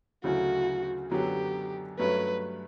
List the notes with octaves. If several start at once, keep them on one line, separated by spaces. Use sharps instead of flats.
D2 C#3 F#3 A3 E4 F#4
F#2 D3 F#3 B3 G4
G2 F#3 A3 C#4 B4